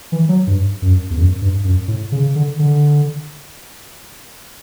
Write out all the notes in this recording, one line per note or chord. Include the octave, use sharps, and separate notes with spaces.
E3
F#3
G2
F#2
E2
F#2
G2
F#2
A2
C#3
D3
D3